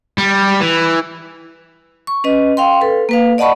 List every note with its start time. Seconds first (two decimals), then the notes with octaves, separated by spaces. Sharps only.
0.18 G3
0.61 E3
2.07 C#6
2.24 C#4 B4 D#5
2.57 F5 G5 C6
2.81 A4 B4
3.09 A#3 B4 F5
3.38 D5 D#5 F#5 A5 B5 C#6